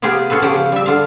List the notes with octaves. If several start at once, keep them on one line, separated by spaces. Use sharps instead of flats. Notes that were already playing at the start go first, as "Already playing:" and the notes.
C3 B3 F4 G4 G#4
B3 C#4 F4 A4 B4
C#3 F3 G4 G#4
C#3
G3 E5
D3 F4 F5